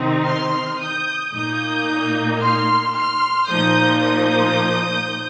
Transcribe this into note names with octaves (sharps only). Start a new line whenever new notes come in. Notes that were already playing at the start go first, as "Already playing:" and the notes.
Already playing: C3 D#3 C4 D#4
C6 F6
D#6 G6
A#2 A#3 D#4 D#6 G6
C6 F6
C6 F6
A#2 F3 A#3 D#4 D#6 G6
D#6 G6